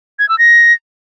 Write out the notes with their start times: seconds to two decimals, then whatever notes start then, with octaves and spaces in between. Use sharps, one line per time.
0.19 G#6
0.29 E6
0.39 A#6